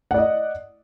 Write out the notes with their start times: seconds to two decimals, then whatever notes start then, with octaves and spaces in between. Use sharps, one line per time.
0.11 F#5
0.14 D5
0.18 D#5